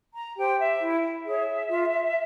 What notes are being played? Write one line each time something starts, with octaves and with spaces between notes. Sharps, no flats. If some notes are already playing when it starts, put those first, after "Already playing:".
A#5
G4 C5 G5
E5
E4
G#4 C#5 E5
F4